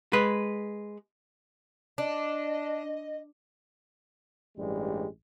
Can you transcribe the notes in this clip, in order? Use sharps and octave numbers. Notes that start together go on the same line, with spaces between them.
G#3 B4
D4 D#5
A1 G2 G3 G#3